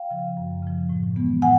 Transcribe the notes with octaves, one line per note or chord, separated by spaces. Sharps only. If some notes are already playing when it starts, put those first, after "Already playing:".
Already playing: F5 G5
C#3 F3
F#2
C#3 F3
A2
E3 G#3 B3
A2 F#5 G#5